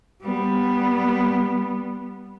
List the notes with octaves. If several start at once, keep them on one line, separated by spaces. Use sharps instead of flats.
G3 B3